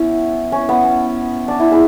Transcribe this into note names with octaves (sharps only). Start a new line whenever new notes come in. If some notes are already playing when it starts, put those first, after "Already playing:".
Already playing: B3 C#4 E4
C#4
B3
C#4
D4
E4
E4 G#4